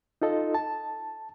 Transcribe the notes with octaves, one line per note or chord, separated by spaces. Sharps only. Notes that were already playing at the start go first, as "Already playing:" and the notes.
D#4 F4 A4 D#5
A5